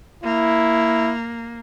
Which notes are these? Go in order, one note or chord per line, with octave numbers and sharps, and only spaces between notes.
A#3 E4